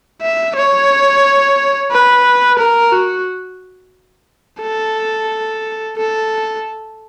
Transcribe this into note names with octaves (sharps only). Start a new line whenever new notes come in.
E5
C#5
B4
A#4
F#4
A4
A4